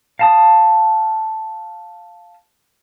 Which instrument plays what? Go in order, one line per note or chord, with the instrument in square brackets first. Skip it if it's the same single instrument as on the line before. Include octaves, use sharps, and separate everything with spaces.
[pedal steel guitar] F5 A5 D#6